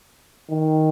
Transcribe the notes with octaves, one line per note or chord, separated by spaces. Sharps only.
D#3